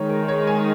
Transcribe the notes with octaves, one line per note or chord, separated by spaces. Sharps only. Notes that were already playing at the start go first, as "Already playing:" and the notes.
Already playing: D#3 G#3 D#4 C#5
A#4
C#5
G#5